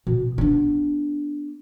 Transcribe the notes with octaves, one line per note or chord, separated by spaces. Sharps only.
B2
B3 D4